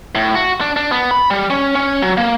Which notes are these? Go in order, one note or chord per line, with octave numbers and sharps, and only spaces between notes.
A2
F#4
D4
D4
B3
B5
G3
C#4
C#4
F#3
A#3